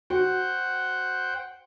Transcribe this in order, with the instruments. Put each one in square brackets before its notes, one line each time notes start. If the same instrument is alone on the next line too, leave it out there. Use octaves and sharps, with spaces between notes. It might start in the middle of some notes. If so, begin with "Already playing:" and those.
[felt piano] F#4 [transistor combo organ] C5 F#5 G5